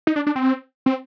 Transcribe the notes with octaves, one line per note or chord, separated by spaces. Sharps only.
D#4
D4
D4
C4
C4